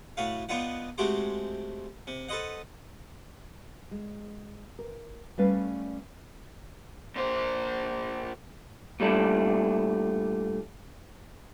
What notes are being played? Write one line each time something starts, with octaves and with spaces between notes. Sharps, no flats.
A2 F#4 B4 F5
B3 D4 D#4 F4 B4 F#5
G#3 A3 C4 F#4 G4 C5
C3
A4 B4 C5 D#5 F#5
G#3
A#4
G3 A3 C#4 B4 D5 F5
A#2 C5
A#2 G3 A3 D4